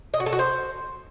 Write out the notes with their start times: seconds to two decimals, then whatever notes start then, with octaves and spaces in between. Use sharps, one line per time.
0.14 D#5
0.20 F#4
0.26 A4
0.33 F#4
0.39 C5